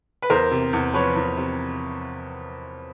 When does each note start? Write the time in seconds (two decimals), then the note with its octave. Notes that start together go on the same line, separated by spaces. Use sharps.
0.22 B4
0.30 E2 A#4 C5
0.51 C3
0.73 E2
0.94 F3 B4 C#5
1.16 E2
1.37 C3